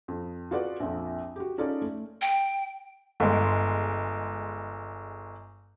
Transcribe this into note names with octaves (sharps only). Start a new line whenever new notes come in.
F2
F4 F#4 G#4 B4 D5 F#5
A#1 F2
F#4 G4
C#4 D#4 F4 G#4 A4 D5
A3
G5
G1 G#3